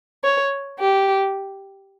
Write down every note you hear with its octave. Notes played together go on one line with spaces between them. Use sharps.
C#5
G4